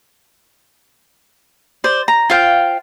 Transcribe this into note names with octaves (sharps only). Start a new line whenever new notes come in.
C5 D5
A#5
F4 C5 F5 G5